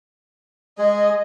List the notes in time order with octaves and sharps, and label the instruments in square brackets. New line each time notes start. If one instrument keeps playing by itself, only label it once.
[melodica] G#3 G#4 [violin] D#5